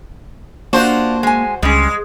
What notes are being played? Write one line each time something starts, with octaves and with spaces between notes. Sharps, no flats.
A#3 D4 F4 F#4 C5
G#3 G#5
C#2 G3 G#3 C#4